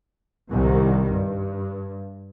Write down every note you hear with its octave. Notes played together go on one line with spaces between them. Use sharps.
C2 D#3 G3
G2